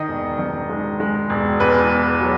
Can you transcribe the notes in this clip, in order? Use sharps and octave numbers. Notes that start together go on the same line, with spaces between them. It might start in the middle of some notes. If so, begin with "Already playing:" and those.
Already playing: D#3 D#5
E1
D#3
G#3
G#3
E1
E2 B4
E2
F#3